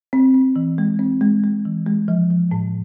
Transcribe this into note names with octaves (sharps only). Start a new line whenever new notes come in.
C4
C4
E3
G#3
C4
G#3
G#3
E3
G#3
F3
F3
A2